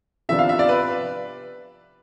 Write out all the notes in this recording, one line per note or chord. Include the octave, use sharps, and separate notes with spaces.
C3 F3 B3 D4 E5
F5
E5
D5
B4